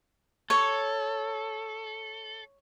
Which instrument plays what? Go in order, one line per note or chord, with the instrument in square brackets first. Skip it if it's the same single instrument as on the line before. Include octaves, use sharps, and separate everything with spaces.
[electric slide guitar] A4 [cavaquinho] C#5